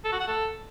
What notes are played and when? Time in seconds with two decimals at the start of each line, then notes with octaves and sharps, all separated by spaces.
0.05 A4
0.12 F#4
0.20 F#5
0.28 A4